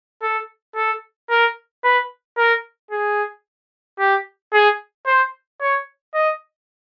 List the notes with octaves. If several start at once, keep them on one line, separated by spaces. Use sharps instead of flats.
A4
A4
A#4
B4
A#4
G#4
G4
G#4
C5
C#5
D#5